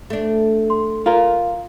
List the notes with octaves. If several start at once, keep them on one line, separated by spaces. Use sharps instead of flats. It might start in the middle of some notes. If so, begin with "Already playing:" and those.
A3 D4
C6
F4 A#4 F5